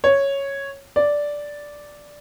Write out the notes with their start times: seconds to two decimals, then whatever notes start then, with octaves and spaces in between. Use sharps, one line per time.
0.04 C#5
0.96 D5